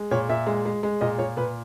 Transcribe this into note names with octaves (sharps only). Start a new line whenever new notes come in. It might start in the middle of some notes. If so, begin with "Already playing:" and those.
Already playing: G#3
A#2 C#5
A#2 E5
G#3
G#3
G#3
A#2 D#5
A#2 C#5
A#2 B4